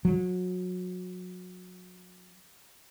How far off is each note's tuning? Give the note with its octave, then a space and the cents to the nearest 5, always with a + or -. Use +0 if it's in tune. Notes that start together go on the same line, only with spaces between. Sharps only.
F#3 -30